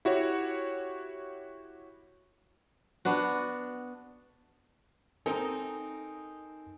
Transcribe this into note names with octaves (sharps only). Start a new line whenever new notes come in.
E4 F#4 G4 C#5
B3 D4 F#4
C4 D#4 A4 A#4 G#5